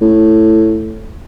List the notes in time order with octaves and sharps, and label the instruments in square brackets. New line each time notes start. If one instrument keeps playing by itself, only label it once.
[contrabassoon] A2